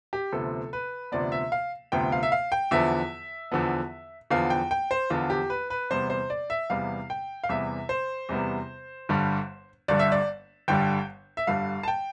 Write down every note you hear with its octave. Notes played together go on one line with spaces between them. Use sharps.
G4
D2 C3 F3 B3 A4
B4
D2 C3 F3 B3 D5
E5
F5
D2 C3 F3 B3 G5
F5
E5
F5
G5
E2 D3 F3 B3 E5
E2 D3 F3 B3
E2 D3 F3 B3 F5
G5
G5
C5
E2 D3 F3 B3 F4
G4
B4
B4
E2 C3 G3 B3 C5
C5
D5
E5
E2 C3 G3 B3 F5
G5
F5
E2 C3 G3 B3 E5
C5
E2 C3 G3 B3
G1 G2 D3 G3
G1 G2 D3 G3 D5
E5
D5
G1 G2 D3 G3 G5
E5
G1 G2 D3 G3 F5
A5
G5